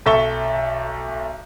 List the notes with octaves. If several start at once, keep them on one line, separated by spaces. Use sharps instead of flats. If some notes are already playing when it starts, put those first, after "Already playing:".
B1 A4 E5 C#6 G7